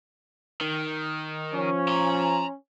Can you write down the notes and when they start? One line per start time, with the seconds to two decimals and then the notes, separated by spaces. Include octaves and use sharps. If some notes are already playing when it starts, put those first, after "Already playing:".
0.61 D#3
1.54 F3 C#4
1.88 A#5 C6